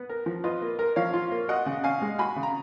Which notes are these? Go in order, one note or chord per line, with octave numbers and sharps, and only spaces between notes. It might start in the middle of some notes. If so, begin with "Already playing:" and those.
Already playing: B3 B4
A#4
F3
F4 B4 D#5
A#3
A#4
F3 C#5 F5
F4
A#3
F#4 D#5 F#5
C#3
C#4 F5 G#5
G#3
F#4 G#5 B5
C#3
A#5